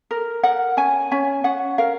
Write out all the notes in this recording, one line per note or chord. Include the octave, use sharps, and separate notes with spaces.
A#4
A#4 F#5
C#4 G#5
C#4 G#5
C#4 F#5
A#4 F5